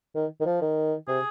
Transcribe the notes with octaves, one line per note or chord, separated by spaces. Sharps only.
D#3
D#3
F3
D#3
C3 G#4